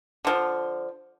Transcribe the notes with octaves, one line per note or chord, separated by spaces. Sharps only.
D3 F3